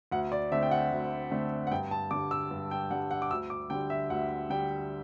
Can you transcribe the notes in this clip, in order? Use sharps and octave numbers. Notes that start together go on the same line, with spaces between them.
D2 F#5
D5
D3 A3 C4 E5
G5
F#5
D2
D3 A3 C4
F#5
G2 G5
A5
D3 G3 D6
E6
G2
G5
D3 G3 F#5
F#5
D6
D2 E6
D6
D3 G3 G5
E5
D2 F#5
D3 G3 G5